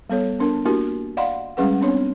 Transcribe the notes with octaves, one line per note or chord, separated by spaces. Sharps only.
G3 B3 A4 C#5
B3 D4 A#4 A5
A#3 D4 E4 F#4 G4 A#4
D5 D#5 F5 F#5 B5 C6
G3 G#3 C#4 G#4 B4 F#5
B3 C4 D4 C#5